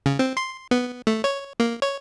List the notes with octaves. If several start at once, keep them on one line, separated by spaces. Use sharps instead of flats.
C#3
C4
C6
B3
A3
C#5
A#3
C#5